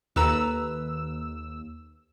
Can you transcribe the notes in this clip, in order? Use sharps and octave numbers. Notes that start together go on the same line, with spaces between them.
D#2 A4 B4 A#5 E6